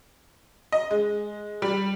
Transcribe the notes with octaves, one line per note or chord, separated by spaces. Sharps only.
D#5
G#3
G3